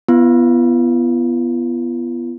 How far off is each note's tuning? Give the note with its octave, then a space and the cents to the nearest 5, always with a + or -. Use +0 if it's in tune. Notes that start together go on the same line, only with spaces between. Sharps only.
B3 +0 F4 -45